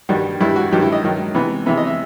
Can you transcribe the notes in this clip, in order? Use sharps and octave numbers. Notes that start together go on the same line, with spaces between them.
G2 D#3 G3 F#4
G2 D#3 G3 E4
F#4
G2 D#3 F#3 G4
E4
D#5
G2 D#3 F#3
C3 E3 B3
C3 E3 B3 E5
D#5
E5